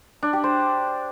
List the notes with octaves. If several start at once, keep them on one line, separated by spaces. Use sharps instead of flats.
D4
G4
C5